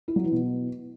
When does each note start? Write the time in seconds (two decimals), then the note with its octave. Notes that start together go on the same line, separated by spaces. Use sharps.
0.08 E4
0.16 F#3
0.24 E3
0.32 B2